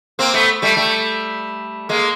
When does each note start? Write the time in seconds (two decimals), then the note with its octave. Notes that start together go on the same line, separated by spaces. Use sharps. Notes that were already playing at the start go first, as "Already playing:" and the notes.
0.19 A#3 C4
0.34 A3 B3
0.62 G3 A3
0.77 G3 A3
1.89 G#3 A#3